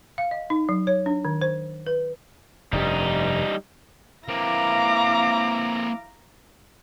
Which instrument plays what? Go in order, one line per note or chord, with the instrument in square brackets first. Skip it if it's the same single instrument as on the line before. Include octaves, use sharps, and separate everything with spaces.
[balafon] F5
D#5
D#4
F#3
C#5
D4
D#3
C5
B4
[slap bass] F1 G2 [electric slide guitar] G3 D#4
[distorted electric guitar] A#3 C4 [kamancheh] E4 D6 [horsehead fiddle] F5 [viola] A#5